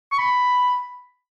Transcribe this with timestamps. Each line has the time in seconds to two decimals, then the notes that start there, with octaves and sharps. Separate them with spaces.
0.12 C#6
0.19 B5